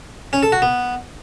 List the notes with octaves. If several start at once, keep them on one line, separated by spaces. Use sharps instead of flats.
C#4
A4
F#4
B3